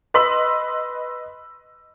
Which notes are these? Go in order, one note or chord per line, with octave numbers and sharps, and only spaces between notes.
B4 D#5 C6 E6 B6 F#7